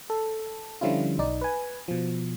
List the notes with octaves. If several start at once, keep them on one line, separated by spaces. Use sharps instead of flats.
A4
D3 F3 G3 C#4 E4 F4
B1 D#4 D5
B4 G#5
B2 F3